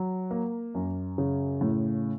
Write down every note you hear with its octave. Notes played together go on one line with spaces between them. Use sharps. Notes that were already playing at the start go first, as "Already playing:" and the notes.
Already playing: F#3
A#3
F#2
C#3
A2